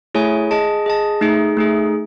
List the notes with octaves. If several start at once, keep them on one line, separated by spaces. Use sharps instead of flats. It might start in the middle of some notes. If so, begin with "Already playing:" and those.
A3 E4 G#4 C#5 G#5
G#4 D#5 A5
G#4 D#5 A5
A3 D#4 G#4
A3 D#4 G#4